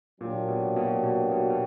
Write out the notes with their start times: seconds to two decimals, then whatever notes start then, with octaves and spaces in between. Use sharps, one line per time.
0.21 A#2 F#3 A#3 D4 G4
0.48 B2
0.76 B2
1.04 B2
1.31 B2
1.50 B2